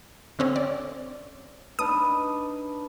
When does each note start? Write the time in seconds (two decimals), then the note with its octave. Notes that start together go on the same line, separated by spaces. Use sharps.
0.39 D3 C4 C#4
0.56 D5
1.79 D4 D#4 B4 D#6